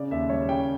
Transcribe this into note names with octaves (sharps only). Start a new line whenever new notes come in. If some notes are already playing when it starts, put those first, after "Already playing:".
Already playing: C#3 D5
D#2 E5
G3 C#5
C#3 G5